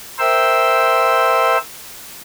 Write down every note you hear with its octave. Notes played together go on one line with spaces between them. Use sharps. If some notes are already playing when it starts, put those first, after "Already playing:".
A#4 C5 E5 G5 C6 E6